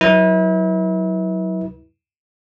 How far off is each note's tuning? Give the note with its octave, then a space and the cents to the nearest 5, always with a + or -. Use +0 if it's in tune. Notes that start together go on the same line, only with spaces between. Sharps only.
F#3 +0 E4 -35 B4 -30